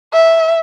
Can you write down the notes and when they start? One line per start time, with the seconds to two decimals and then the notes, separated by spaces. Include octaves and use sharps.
0.13 E5